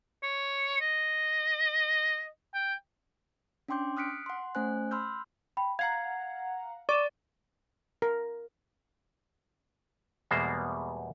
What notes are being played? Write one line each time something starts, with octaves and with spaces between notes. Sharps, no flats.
C#5
D#5
G5
C#4 D4 G5 C6 D6 G6
D#6 F6 F#6 B6 C#7 D7
F#5 C6
A3 C#4 C5 G#5 F#6
B5 C6 E6 F6 G6
G5 B5
F5 F#5 A#5 G#6 C7
D5 C#6 D6 D#7 E7
A#4
E2 B2 G3 G#3 A#3 C5